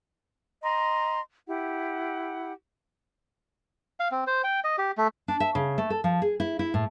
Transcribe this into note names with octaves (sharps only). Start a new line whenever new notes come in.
D#5 A#5 C6
E4 G4 F#5
F5
C4
C5
G5
D#5
G4
A3
D4
E5
C#3
A3
A4
F3
G#4
E4
E4
A2